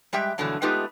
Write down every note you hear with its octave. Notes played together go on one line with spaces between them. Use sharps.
G3 G#3 G4 E5 G5
G2 B2 D3 E3 F#3 A3
G#3 A3 B3 D#4 F4 G4